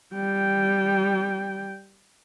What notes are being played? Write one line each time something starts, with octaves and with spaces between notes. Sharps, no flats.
G3 G5